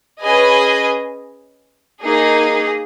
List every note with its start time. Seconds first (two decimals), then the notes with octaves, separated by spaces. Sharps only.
0.22 C#4 G#4 B4 D#5 G#5
2.02 A#3 D#4 G#4